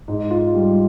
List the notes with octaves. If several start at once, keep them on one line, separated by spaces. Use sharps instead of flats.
G#2
F4
G3